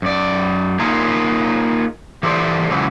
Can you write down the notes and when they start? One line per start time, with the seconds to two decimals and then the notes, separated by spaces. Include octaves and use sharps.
0.02 F#2 D5
0.79 A#3 D#4 F4 G#4 A#4
2.23 E3 G4 A4 B4 C5 D5
2.71 C#3 E3 F#3 G#3